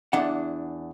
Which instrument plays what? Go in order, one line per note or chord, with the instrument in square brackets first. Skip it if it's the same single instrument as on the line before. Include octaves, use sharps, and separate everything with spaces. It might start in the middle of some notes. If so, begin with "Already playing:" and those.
[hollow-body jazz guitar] E2 D4 F#5